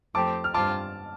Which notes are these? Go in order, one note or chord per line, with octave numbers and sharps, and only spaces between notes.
F2 F3 A3 C4 G4 A5 D6
F6
G2 G3 C4 F4 A5 D6